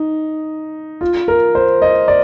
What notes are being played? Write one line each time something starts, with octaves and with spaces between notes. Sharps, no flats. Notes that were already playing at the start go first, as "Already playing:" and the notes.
Already playing: D#4
F4
A#4
C5
D#5
D5